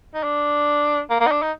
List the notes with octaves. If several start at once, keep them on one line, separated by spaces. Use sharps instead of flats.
D#4
D4
A#3
A#3
D#4
D4
D#4